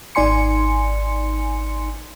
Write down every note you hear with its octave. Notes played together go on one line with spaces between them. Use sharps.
G#1 D#4 D5 G#5 C6 C#7